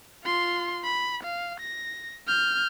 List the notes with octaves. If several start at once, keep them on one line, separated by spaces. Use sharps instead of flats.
F4 C6
B5
F5
A#6
F6 G6